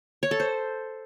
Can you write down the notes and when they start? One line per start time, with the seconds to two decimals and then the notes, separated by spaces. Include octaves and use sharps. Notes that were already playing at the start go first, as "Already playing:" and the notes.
0.23 C#5
0.31 A4
0.40 C5